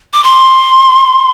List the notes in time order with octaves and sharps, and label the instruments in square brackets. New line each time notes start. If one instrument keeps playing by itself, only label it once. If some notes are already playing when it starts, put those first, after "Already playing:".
[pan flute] D6
C6